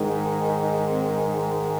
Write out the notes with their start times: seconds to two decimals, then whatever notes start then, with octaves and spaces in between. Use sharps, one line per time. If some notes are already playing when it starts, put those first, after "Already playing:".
Already playing: G#2 D#3 G#3
0.89 C4